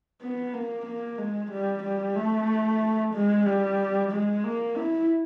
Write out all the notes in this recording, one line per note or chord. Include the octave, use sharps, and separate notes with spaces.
B3
A#3
A#3
G#3
G3
G3
A3
G#3
G3
G#3
A#3
E4